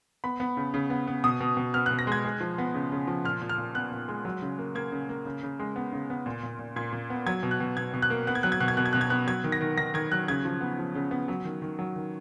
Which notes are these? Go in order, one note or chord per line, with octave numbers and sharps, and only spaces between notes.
B3 B5
B3
C#3
C#3
B3
B3
B2 D#6
B2
B2
B3 F6
B2 F#6
A#6
G#3 G#6
G#3
F3
B3
C#3
C#3
F3
A#2 F6
A#2
F6
A#2
B3 F#6
A#2
G#3
F#3
C#3
A#3
A#3 G#6
C#3
A#3
C#3
C#3
G#3
B3
C#3
B3
A#2
A#2
A#2
A#2 G#6
A#2
B3
F#3 G#6
B2
F#6
B2
B2 G#6
B2
F#6
A#3
B3 F#6
G#6
F#3 F#6
G#6
B2 F#6
G#6
B2 F#6
G#6
B2 F#6
G#6
B3 F#6
F#3 G#6
D#3
A#6
D#3
D#3 A#6
D#3 G#6
F#3 F#6
C#3 G#6
F3
B3
F3
C#3
B3
F#3
D#3
D#3
F#3
D#3